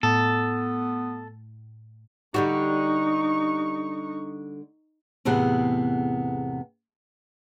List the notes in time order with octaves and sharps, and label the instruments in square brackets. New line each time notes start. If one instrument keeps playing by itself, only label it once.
[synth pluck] A2 [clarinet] B3 [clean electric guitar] A4
[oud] D3 G3 F#4 [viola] D#4 C#6
[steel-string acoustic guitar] E2 A2 C3 B3 G#4 F#5